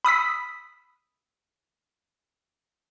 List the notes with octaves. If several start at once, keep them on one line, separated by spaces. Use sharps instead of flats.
B5 D#6 E6 B6